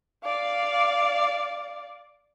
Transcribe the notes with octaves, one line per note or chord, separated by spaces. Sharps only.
D5 F5